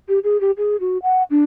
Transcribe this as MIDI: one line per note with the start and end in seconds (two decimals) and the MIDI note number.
0.09 0.19 67
0.24 0.40 68
0.41 0.51 67
0.58 0.76 68
0.80 0.98 66
1.03 1.23 78
1.30 1.44 62